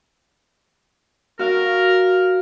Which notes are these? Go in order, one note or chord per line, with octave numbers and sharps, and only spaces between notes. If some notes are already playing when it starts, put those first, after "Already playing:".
F#4 A#4 F5